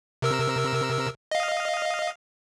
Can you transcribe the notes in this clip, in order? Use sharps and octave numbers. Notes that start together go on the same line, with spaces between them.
C3 A#4 E6
D#5 F5